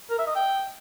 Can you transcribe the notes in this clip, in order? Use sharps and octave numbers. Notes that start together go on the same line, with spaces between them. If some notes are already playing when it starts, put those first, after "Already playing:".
A#4
E5
D#5
G5